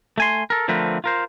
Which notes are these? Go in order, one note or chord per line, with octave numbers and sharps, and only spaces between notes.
A3 G#5 C6
A4 A#4
D3 F3 A3 C4 A#4 B4
F4 A#4 C5